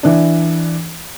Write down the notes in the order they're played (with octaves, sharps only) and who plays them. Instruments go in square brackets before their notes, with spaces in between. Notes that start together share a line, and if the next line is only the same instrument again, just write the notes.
[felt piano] E3 D4